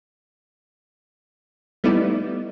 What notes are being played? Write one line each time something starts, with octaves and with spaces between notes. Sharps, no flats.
G3 A3 B3 D#4 E4 D5